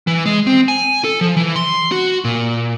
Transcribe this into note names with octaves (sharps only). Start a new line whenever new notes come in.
E3
G#3
C4
G#5
A4
F3
E3
C6
F#4
A#2